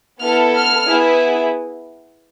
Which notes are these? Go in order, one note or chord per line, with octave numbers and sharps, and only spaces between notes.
B3 E4 A4 F6
F6
B3 E4 G#4